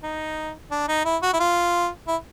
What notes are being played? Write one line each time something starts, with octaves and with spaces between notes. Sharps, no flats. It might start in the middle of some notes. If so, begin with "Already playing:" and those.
D#4
D4
D#4
E4
F#4
E4
F4
E4